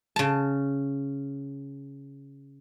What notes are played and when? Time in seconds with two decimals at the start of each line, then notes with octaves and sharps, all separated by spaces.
0.16 C#3 A5